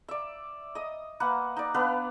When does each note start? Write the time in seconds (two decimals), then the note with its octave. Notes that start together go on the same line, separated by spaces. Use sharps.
0.08 D5 E5
0.75 D#5 D#6
1.20 A#3 B4 F#5
1.56 D#4 D5
1.74 B3 D4 B4 F5